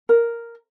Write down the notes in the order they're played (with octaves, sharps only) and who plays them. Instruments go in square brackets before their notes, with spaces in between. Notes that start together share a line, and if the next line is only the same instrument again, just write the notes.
[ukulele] A#4